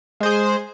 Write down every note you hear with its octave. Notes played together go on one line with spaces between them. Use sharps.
G#3 G#4 C5